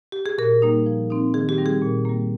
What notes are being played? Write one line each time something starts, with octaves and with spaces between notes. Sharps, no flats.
G4
G#4
A#2 A#4
G3 A#3 D#4
F3
C4 D#4
D#3 G#4
G4
G3 C4 D#4
G#4
A#2
G3 A#3